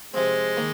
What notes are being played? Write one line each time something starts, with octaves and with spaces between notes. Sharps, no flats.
C3 F3 G#3 C4
D#3 A#3 D#4